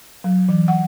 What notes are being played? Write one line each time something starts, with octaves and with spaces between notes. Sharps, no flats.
F#3
E3
F#5